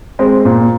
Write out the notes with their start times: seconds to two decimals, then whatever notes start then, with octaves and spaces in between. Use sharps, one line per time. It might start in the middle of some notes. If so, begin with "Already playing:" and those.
0.19 G#3 C4
0.45 A#2